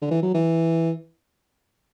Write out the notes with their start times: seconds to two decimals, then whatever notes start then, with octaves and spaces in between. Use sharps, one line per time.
0.02 D3
0.11 E3
0.23 F#3
0.34 E3